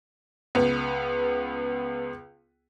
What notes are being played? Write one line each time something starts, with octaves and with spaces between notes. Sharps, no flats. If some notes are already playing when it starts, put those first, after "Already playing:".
C#2 B3